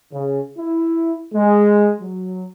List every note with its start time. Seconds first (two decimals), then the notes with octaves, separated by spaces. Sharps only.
0.13 C#3
0.59 E4
1.34 G#3
2.01 F#3